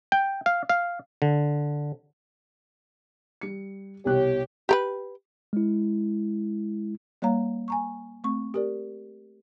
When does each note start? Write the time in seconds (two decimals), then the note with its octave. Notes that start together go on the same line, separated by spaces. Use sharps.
0.12 G5
0.46 F5
0.69 F5
1.22 D3
3.41 G3 C#7
4.05 C2 B2 G4 C#5 F#6
4.69 G4 A#4 B4
5.53 G#3 E4
7.22 G3 A#3 C#5 F5 A#5
7.68 G#5 A#5 C#6
8.24 A3 C4 C#6
8.54 G4 A#4 D5